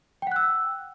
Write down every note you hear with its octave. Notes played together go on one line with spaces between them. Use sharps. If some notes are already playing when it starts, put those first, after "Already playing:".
F#5 G5 E6 F#6